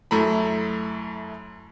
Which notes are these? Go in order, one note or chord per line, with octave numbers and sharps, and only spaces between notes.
F#2 A3 E4 A#5 B5